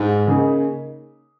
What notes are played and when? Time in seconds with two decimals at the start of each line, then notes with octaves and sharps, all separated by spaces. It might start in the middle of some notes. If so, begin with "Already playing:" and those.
Already playing: G#2
0.27 C#3 A#3 D#4 G#4